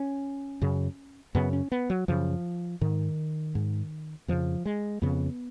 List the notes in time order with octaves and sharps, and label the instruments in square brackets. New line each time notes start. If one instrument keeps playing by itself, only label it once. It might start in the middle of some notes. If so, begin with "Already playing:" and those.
Already playing: [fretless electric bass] C#4
F#2 C#3
F#2 C#3 B3
C#4
B3
F#3
F#2 C#3 F3
G#2 D#3
G#2
F2 C#3 F3
G#3
F2 C#3 B3